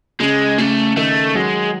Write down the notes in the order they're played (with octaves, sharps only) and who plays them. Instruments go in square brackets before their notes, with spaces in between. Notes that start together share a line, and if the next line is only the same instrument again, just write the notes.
[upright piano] C#3 [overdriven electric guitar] G#3
[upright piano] C#3 [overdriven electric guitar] A3
[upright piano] D#3 [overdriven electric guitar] A3
[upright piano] F#3 [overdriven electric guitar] G#3